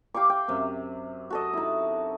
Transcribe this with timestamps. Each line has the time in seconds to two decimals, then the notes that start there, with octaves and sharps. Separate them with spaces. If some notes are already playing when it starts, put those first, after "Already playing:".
0.14 G4 F5 C#6 D6
0.30 G5
0.48 F#2 C3
1.30 F#4 A4 D#5
1.53 D#4 E4